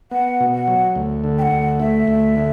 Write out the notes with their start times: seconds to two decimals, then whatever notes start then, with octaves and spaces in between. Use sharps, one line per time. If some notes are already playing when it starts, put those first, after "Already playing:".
0.11 B3 F#5
0.40 B2
0.54 F#5
0.68 F#3
0.96 D2
1.24 D3
1.38 G5
1.42 F#5
1.52 D2
1.80 A3 E5
2.08 D2
2.37 D3